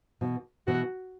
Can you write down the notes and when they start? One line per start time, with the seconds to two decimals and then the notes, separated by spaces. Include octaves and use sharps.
0.21 B2 E3
0.67 B2 E3 F#4